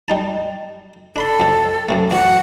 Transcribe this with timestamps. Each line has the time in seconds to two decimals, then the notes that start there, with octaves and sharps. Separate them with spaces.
0.08 G3 D#4 A5
1.16 D4 A4 B5 C6
1.40 F2 C3
1.89 F#2 C3 A3
2.11 E2 F#4 F#5